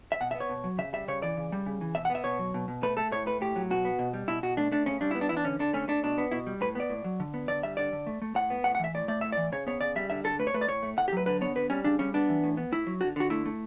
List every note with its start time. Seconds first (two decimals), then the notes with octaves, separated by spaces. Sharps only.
0.12 E5
0.20 B2 F#5
0.31 E5
0.35 B3
0.40 C#5
0.49 B2
0.64 F#3
0.78 C#3 E5
0.93 G3 E5
1.08 C#3 C#5
1.22 E3 D5
1.37 C#3
1.52 G3
1.66 C#3
1.81 E3
1.95 B2 E5
2.05 F#5
2.10 B3
2.15 E5
2.24 B2 C#5
2.39 F#3
2.54 B2
2.68 B2
2.83 A3 B4
2.97 A3 A4
3.12 A2 C#5
3.26 A3 B4
3.41 A2 G4
3.56 F#3
3.70 B2 F#4
3.85 B3
3.99 B2
4.13 G3
4.28 B2 E4
4.43 B2 F#4
4.57 A3 D4
4.72 A3 D4
4.86 C#3 C#4
5.01 G3 D4
5.11 B3 E4
5.21 D4
5.29 E3 E4
5.37 D4
5.45 D3 C#4
5.59 D3 D4
5.73 A3 C#4
5.88 A3 D4
6.03 B2 D4
6.18 B3
6.31 B2 E4
6.47 G3
6.61 A2 B4
6.75 B3 D5
6.90 A2
7.04 F#3
7.20 D3
7.34 B3
7.48 D3 D5
7.63 G3 E5
7.77 D3 D5
7.93 D3
8.06 A3
8.22 A3
8.35 A2 F#5
8.50 B3
8.64 A2 F#5
8.75 F#5
8.79 E3 E5
8.94 A2 D5
9.08 A3 D5
9.21 A2 E5
9.32 E3 D5
9.52 C#3 C#5
9.67 B3 C#5
9.81 C#3 D5
9.96 G3 E5
10.10 D3 E5
10.24 D3 A4
10.39 A3 B4
10.47 C#5
10.54 A3 B4
10.61 D5
10.68 A2 C#5
10.83 A3
10.97 A2 F#5
11.08 G4
11.12 F#3 B4
11.26 D3 B4
11.41 B3 C#5
11.55 D3 B4
11.70 G3 C#4
11.84 C#3 D4
11.99 G3 C#4
12.14 B3 D4
12.29 E3
12.44 A2
12.57 B3
12.72 A2 E4
12.87 F#3
13.01 D3 F#4
13.16 D3 F#4
13.30 A3 E4
13.45 A3